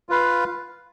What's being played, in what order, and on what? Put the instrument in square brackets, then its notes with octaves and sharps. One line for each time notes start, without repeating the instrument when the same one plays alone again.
[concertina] F4 B4 F5